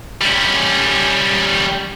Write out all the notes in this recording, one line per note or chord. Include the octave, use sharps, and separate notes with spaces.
G3 C#4